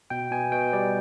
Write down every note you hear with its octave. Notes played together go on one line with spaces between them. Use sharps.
B2 G5
B2 G#5
B2 G5
G3 D5